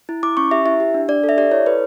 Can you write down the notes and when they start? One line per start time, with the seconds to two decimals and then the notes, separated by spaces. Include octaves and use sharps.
0.09 E4
0.23 E4 D6
0.37 C#4 C#6
0.51 G4 E5
0.66 E4 E5
0.80 G4
0.94 D4
1.09 D4 D5
1.24 A4
1.29 E5
1.37 G4 D5
1.52 E4 C#5
1.66 A4 B4